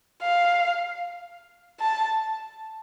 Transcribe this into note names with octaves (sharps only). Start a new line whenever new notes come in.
F5
A5